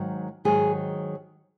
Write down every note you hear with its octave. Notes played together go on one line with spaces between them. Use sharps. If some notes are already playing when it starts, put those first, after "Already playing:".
Already playing: G#2 D#3 F#3
G#2 D#3 F#3 G#4